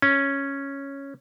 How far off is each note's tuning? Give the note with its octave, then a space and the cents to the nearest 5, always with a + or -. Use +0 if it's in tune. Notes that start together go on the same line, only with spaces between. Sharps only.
C#4 -5